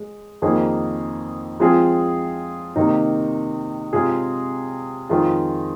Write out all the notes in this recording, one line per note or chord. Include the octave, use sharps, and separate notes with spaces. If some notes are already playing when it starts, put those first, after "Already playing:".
Already playing: G#3
F2 D#3 A#3 D#4 G#4
F3 G#3 C4 F4 G#4
C3 D#3 A#3 D#4
C3 G#3 F4 G#4
F2 D#3 G#3 F4